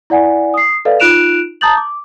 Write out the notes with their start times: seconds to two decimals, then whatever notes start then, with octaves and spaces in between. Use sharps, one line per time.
0.10 E4 D5 F#5 G#5
0.54 D#6 C7
0.85 A4 B4 D5 D#5 F5
1.00 D#4 F4 F#6 D7 E7 F7
1.61 A5 A#5 D#6 G6 A6 F#7
1.77 D6